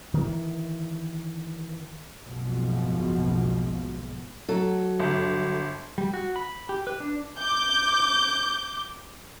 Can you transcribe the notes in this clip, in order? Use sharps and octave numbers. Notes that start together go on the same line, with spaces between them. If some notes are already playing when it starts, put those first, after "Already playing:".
D#3 E3
F#1 B1 G#2 B2 F3
F#3 A4
G1
G3
F#4
B5
G4
B4
D4
D6 G6